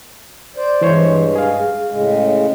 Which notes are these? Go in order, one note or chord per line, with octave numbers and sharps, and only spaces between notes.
C5 D5
G2 E3 G#3 C5 C#5
G#4 F5
A2 C#3 G#3